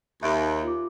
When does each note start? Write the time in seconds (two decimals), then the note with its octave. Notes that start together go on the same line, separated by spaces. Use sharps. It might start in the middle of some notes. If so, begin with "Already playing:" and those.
0.23 D#2 E5 D7
0.63 F4 D6